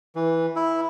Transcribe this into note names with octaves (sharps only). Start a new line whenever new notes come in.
E3
E4